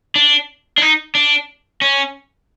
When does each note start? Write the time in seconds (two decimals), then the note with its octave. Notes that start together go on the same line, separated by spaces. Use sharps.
0.16 D4
0.78 D4
0.82 D#4
1.15 D4
1.82 C#4